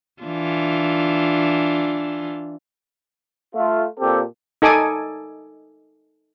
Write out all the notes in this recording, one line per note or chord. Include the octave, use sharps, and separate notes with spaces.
E3 D4 F4
A3 F4
A#2 C4 G4 A4
D#4 A4 G#5 D6 D#6